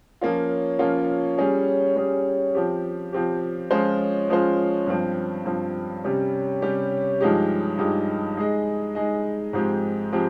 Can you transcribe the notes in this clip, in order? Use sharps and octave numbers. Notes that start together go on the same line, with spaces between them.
F3 A#3 C#4 F4
F3 A#3 C#4 F4
G3 C#4 G#4
G3 C#4 G#4
F3 C4 G4
F3 C4 G4
F3 G#3 C#4 F4 C5
F3 G#3 C#4 F4 C5
G2 F3 C4
G2 F3 C4
C3 G3 C#4 G4
C3 G3 C#4 G4
G2 F3 G#3 D#4 G4
G2 F3 G#3 D#4 G4
G#3 D#4 G#4 D#5
G#3 D#4 G#4 D#5
G#2 F3 G#3 C4 G4
F3 G#3 C4 G4